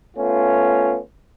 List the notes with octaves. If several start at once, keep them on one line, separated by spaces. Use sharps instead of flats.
A3 B3 C#4 F4